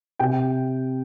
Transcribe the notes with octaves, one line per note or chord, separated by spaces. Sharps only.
C3 G5